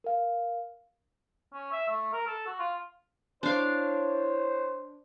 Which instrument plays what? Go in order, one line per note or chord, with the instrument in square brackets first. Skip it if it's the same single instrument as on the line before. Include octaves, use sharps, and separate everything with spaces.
[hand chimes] A#4 F5
[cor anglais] C#4
E5
A3
A#4
A4
F#4
F4
[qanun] D4 F5 [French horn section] E4 C#5 [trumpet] C5